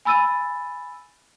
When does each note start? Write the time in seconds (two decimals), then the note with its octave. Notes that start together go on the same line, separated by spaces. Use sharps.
0.05 G#5 B5 E6 A6 D#7